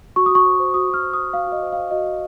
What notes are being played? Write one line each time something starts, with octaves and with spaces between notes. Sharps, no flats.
F#4 C#6
D#6
F#4 C#6
C5
C5
F#4 D#6
F#4 F6
C5
C5 D#6
F#4 F5
F#4
D#5
C5
C5 F5
F#4 D#5
F#4